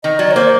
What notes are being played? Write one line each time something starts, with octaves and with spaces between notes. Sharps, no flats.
D#3 D#5
F#3 D5
C#5
A#3 C5